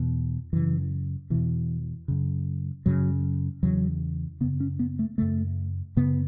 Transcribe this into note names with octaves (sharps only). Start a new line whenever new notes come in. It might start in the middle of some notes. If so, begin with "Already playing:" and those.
Already playing: E2 B2
F#2 C#3 E3
E2 B2 E3
F#2 C#3
F#2 C#3 F#3
E2 C#3 F#3
F#2 C#3 B3
C#4
B3
A3
F#2 C#3 A3
F#2 C#3 B3